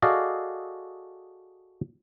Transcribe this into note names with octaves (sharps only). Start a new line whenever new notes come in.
F#4 G#4 A4 D5 D#5 F5